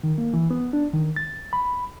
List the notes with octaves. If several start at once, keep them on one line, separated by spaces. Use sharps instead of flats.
D#3
A#3
E3
B3
D4
D#3
A6
B5